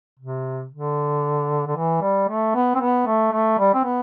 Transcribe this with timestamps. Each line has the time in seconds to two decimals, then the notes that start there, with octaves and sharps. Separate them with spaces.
0.20 C3
0.72 D3
1.67 D3
1.76 E3
2.02 G3
2.29 A3
2.55 B3
2.75 C4
2.81 B3
3.07 A3
3.32 A3
3.59 G3
3.75 C4
3.85 B3